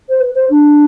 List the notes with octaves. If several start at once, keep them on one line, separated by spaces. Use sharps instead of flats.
C5
B4
C5
D4